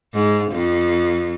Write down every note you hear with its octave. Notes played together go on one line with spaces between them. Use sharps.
G#2
F2